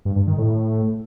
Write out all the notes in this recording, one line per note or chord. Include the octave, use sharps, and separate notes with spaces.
G2
G2
D#3
A2